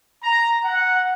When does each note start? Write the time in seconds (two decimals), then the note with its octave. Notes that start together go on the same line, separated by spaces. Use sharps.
0.24 A#5
0.64 F#5